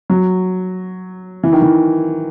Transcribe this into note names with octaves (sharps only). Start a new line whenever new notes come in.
F#3
E3
D#3
E3